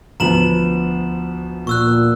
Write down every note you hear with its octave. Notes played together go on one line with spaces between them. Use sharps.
D2 F3 B3 A#5 E7 F#7
A#2 C#6 E6 F#6